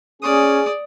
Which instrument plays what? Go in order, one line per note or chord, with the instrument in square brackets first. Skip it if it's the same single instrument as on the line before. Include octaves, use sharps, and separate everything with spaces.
[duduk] C#4 [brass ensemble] G#4 [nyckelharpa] D5 D#6